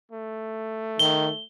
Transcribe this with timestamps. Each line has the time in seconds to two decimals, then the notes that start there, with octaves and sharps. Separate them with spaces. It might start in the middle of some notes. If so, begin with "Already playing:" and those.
0.11 A3
0.99 D#3 G7